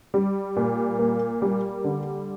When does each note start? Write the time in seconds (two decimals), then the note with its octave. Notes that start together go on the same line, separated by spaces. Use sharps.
0.14 G3
0.56 A#2
0.99 A#3
1.42 G3
1.84 D3